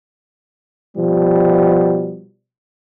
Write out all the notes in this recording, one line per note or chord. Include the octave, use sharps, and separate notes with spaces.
B2 F3 G3